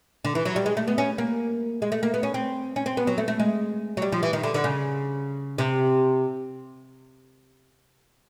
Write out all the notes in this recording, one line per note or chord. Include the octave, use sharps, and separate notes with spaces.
D3
E3
F#3
G3
G#3
A3
B3
C#4
A#3
G#3
A3
A#3
B3
C#4
C4
C#4
C4
B3
F#3
A3
A3
G#3
F#3
G3
F3
E3
D#3
D3
D3
C#3
C3